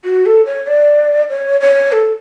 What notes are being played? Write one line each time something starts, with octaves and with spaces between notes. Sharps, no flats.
F#4
A4
C#5
D5
C#5
C#5
A4